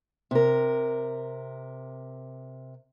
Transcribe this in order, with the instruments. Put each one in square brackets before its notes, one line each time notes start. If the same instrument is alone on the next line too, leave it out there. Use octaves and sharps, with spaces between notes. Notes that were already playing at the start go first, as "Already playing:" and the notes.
[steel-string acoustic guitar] C3 A#4